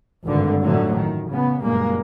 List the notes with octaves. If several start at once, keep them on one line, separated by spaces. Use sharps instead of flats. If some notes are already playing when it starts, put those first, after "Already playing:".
G#1 G2 D3
A1 F2 D3 F3 F#3 A3
D#3
C#3 B3
F#1 G2 A#2 G#3 A#3